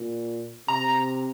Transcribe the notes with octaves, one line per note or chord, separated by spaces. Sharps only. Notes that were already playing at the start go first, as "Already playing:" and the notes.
Already playing: A#2
C3 A#5